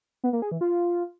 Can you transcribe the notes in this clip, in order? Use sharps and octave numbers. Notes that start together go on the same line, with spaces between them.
B3
A#3
G#4
E3
F4